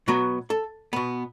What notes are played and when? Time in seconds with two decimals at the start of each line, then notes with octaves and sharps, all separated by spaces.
0.08 B2 F#3 B3 F#4
0.50 A4
0.93 B2 B3 B5